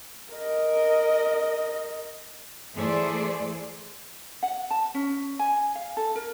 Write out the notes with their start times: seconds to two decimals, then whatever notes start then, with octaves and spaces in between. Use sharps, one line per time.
0.34 A#4 D#5
2.75 E3 A3 G#4 A4 C5 D5
4.43 F#5
4.71 A5
4.94 C#4
5.39 G#5
5.75 F5
5.97 A4
6.16 A#4